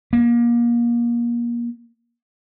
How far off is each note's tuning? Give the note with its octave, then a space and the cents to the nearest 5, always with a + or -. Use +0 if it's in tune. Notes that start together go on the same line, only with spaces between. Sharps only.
A#3 +30